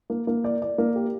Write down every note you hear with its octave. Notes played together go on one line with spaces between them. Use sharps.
A#3
A#3
D5
D5
A#3
G4